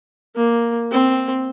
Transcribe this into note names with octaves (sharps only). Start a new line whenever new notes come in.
A#3
C4